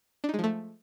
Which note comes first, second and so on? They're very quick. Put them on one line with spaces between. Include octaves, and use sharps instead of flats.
D4 D#4 G#3 F3 A3